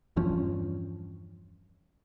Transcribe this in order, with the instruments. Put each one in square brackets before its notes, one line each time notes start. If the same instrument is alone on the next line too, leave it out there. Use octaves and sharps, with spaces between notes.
[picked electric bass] E2 G2 F3 C#4